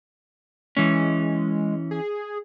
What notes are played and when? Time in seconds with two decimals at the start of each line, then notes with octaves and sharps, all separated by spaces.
0.77 E3 G#3 C#4
1.91 G#4